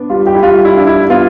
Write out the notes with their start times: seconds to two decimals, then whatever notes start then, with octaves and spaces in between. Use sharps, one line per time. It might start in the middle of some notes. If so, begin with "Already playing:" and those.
Already playing: B3 D4
0.10 G3 F4
0.27 G4
0.35 E4
0.43 G3 F4
0.65 E4
0.77 D4
0.87 E4
1.10 B3 F4